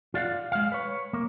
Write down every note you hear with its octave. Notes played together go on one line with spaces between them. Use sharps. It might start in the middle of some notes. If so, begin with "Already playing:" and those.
F4 D5 F5 F#5
G#3 F5
B4 C#5
A#3